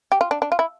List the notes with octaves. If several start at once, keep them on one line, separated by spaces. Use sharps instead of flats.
G4
F4
D4
D4
F4
E4